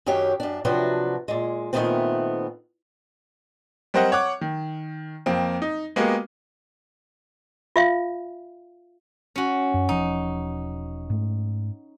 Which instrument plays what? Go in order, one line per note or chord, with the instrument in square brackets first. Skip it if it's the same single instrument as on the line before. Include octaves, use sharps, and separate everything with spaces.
[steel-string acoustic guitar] F#2 D#3 F#3 G4 C#5
F#2 D4
C3 F3 F#3 D4 F#4 B4
A#2 G#3
A#2 D#3 F3 A3 B3 C4
[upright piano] G3 C4 A#4 C5 D#5 F#5
C#5 F#5 D6
D#3
F2 A#3 C4
D#4
G#3 A#3 B3 F#4 G4 A#4
[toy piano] F4 E5 F5
[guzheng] C#4 F#4
[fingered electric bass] F#2
[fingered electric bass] E1 F3 [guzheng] D#4
[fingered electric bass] G#2 A3